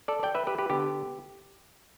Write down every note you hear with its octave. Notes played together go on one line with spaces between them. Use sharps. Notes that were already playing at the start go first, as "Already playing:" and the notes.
A4 D5
D5 G5
B4 E5
G4 B4
G4 B4
D3 B3 D4 G4